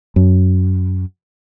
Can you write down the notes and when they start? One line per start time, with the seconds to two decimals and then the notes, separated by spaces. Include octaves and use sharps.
0.16 F#2